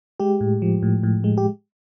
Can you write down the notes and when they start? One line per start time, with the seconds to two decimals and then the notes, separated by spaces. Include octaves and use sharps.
0.20 G#3 G4
0.41 A2
0.62 F3
0.82 A2
1.03 A2
1.24 G#3
1.38 G4